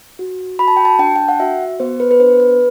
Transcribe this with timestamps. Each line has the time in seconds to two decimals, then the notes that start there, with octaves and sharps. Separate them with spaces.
0.19 F#4
0.59 F#4 B5
0.68 A5
0.77 G5
0.85 A5
0.99 D4 G5
1.07 A5
1.16 G5
1.28 F#5
1.40 F#4 E5
1.80 B3 C5
2.00 B4
2.11 B4
2.20 D4 C5
2.40 B4